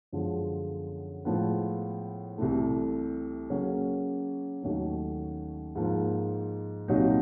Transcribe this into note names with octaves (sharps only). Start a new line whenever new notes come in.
F#2 D3 F3 G#3 B3
A2 F3 G#3 B3
C2 C3 E3 A3
C#3 F#3 A#3 C#4
D#2 D#3 F#3 A3 C#4
G#2 F3 A#3
C2 A#2 F#3 A#3 D#4